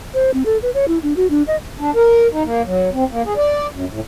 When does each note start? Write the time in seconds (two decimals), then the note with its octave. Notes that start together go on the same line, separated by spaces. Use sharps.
0.14 C5
0.34 C4
0.46 A4
0.62 B4
0.74 C#5
0.88 E4
1.03 D4
1.17 F#4
1.30 D4
1.48 D#5
1.80 D4
1.95 A#4
2.32 D#4
2.44 A#3
2.65 F#3
2.93 C4
3.10 A#3
3.25 G#4
3.37 D5
3.72 F#2
3.91 A2